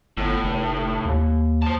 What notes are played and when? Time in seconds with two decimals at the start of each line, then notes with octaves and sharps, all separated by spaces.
0.17 G1 A2
0.44 F1
1.05 D#2
1.62 C5 A5